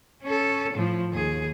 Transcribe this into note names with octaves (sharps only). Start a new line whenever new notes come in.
C#4 A4
A2 F3
D#2 G#4